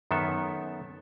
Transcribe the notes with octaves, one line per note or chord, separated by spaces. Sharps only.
F#2 D#3 B3 A4 E5